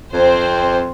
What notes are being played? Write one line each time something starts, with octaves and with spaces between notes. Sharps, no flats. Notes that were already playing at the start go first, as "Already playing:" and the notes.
F2 C4 C5